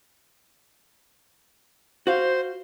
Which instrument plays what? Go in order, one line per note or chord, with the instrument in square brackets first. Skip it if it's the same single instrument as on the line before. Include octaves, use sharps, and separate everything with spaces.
[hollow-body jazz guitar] F#4 F5 [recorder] C5